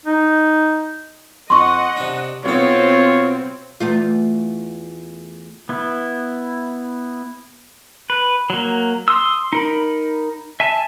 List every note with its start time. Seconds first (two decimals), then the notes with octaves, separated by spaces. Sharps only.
0.06 D#4
1.50 F2 D#5 F#5 C6 C#6
1.97 C3 D4
2.45 B1 B3 C4 F4 C#5
3.80 E2 A3 F4
5.69 B3 E4
8.10 B4
8.50 F#3 A#3
9.08 C6 D#6 E6
9.53 D#4 A#4 B5
10.60 E5 G#5 A5